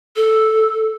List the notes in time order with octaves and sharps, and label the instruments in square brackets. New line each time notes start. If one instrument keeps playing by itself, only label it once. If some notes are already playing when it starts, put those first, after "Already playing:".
[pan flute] A4